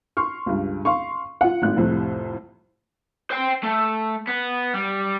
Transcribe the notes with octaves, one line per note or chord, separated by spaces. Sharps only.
C6 C#6 F6
C#2 G2
F5 C6 C#6
F4 F#5
G#1 A2 F#6
C2 F2 A2 C3
C5 G5
A3
B3
G3